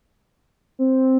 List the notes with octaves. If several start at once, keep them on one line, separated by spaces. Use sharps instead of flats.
C4